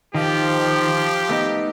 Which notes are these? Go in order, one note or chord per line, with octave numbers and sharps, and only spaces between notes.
D#3 F3 G4
A3 B3 D#4